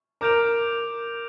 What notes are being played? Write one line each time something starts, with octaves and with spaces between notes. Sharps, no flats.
A#4 D6 G6 D7 F7